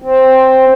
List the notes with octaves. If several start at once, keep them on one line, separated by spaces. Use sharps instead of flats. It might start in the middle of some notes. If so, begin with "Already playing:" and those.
C4